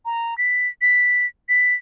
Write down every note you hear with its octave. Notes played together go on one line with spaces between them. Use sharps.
A#5
B6
B6
B6